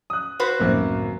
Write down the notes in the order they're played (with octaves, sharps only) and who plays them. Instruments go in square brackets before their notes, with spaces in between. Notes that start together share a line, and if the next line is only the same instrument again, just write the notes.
[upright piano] D#6 F#6
[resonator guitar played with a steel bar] F#4 B4 C5
[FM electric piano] C#2 A2 D#3 [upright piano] F#2 A#3 C4